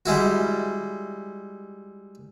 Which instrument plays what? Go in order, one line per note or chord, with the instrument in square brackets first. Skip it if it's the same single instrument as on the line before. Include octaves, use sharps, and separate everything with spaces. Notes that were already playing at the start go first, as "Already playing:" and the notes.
[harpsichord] G3 G#3 E4 F#4